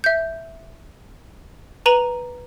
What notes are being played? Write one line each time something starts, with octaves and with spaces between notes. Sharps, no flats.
E5 G6
B4 A#5 D#7 F#7